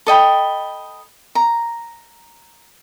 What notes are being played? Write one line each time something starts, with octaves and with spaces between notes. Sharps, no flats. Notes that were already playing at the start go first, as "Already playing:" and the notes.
A4 D#5 G5 B5
A#5